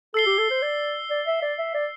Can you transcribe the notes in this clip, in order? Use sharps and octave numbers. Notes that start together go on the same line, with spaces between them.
A4 E6 C7 G7
G4
A4
C5
D5
D5
E5
D5
E5
D5